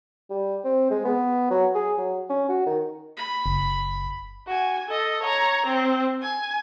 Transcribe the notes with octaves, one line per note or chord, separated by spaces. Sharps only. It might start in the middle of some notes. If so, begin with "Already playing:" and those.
G3
C4
G#3
B3
F#3
G#4
F#3
C#4
F#4
D#3
B5
F#1
F#4 G#5
A4 D#5
C#5 A#5
C4
G#5